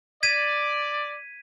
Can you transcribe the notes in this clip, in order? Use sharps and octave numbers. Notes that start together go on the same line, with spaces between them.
D5 G#6 B6 D#7